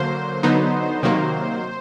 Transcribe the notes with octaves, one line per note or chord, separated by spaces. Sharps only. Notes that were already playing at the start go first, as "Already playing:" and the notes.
Already playing: D3 F#3 A#3 C5
D3 F#3 B3 D#4
C3 D#3 F#3 A#3